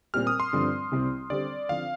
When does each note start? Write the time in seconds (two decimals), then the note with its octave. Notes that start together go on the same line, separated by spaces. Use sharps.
0.14 A#2 G3 C4 G4 F6
0.27 D#6
0.40 C6
0.53 G2 D3 F3 C4
0.91 C2 C3 G3 C4
1.30 D3 G3 C4 G4 C5 D5
1.69 D3 F3 C4 F5